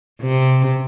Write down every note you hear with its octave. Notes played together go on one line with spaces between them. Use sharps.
C3